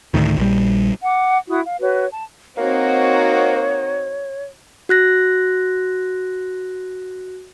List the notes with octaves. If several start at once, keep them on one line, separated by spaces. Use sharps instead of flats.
D2 A2 D#3
A#1 G3
F#5 D6
E4 F#4 D#6
F5
F#4 B4 C#5
A5
A#3 C4 D#4 F#4 C#5
F#4 F#6 A#6